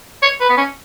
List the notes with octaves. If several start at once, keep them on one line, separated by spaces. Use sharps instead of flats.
C#5
B4
B3
C#4